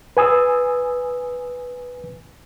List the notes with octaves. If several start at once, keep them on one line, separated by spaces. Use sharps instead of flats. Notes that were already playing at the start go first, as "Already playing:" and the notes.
B4 G#5 D#6 E6